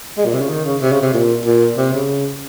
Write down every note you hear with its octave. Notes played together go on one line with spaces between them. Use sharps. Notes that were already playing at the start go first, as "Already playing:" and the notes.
G#3
A#2
C3
C#3
D#3
C#3
C3
C#3
C3
A#2
A#2
C3
C#3